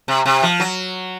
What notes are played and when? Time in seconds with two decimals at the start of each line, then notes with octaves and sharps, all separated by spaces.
0.08 C3
0.26 C3
0.43 F3
0.60 F#3